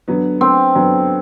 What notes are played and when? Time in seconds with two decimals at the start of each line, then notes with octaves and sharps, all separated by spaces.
0.08 D3 F#3 B3
0.41 C4
0.75 D3 F#3 B3